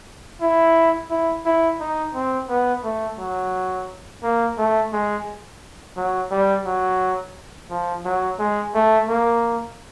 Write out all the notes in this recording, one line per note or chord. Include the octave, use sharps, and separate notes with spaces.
E4
E4
E4
D#4
C4
B3
A3
F#3
A#3
A3
G#3
F#3
G3
F#3
F3
F#3
G#3
A3
A#3